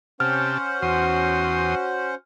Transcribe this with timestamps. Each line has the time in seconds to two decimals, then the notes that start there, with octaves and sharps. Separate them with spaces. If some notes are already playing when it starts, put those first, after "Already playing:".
0.20 C3 C#4 G4 C5 F#5 A5 F6
0.82 E2 F#4 C6 D#6